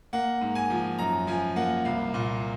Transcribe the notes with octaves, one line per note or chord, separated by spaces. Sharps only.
A#3 F#5
G#2
G#5
F3
F#2 A#5
F3 G#5
A#3 F#5
C2 F5
A#2